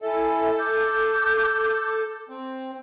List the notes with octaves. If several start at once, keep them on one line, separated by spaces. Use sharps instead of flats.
E4 A4 E5 G#5
D6 G6
C4